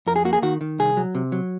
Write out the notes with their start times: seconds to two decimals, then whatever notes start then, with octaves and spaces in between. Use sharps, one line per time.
0.06 F2 A#4
0.16 G#4
0.25 A#3 F#4
0.33 G#4
0.42 D#3 F#4
0.61 D#3
0.79 C2 G#4
0.97 F#3
1.15 C3
1.32 F#3